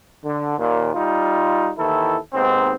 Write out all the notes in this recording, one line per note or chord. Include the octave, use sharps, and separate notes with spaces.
D3
D#2 A#2
G3 D#4 F4
D#2 D#3 E3 E4 A4
D#2 G#2 B3 C4